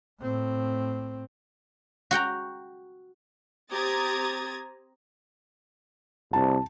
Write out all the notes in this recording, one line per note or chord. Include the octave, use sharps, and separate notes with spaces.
A2 C4
F#4 F#5 G5 A#5
C4 G4 A#5 D#6 G#6 A6
C2 A5